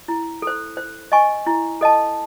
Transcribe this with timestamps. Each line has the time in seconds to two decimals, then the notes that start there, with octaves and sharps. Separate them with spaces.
0.08 E4
0.42 A4 C5
0.77 C5
1.12 D#5 G#5 C#6
1.46 E4
1.81 A4 D#5 A5